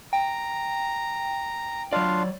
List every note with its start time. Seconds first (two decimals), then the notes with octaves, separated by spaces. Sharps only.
0.13 G5 A#5
1.93 F#3 D4 F4 C#5 D5 F5